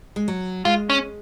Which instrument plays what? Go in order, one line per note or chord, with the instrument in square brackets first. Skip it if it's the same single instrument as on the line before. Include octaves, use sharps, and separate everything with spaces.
[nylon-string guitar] G#3
F#3
[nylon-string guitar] G#3 [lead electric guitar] F4
[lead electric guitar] C#4